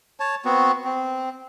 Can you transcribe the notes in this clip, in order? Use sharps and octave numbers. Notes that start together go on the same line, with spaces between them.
C#5 A5
B3 C4 F#4
C4